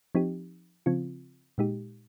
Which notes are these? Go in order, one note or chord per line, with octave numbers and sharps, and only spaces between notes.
F3 C4 D#4 G4
C#3 F3 C4 F4
A#2 G#3 D#4 G4